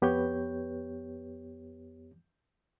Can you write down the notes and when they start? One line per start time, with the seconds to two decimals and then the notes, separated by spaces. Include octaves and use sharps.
0.02 F2 B3 G4 B4 C#5 G6